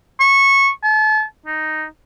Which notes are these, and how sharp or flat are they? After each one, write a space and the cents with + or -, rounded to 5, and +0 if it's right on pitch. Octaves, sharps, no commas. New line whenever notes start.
C#6 -15
A5 -35
D#4 +0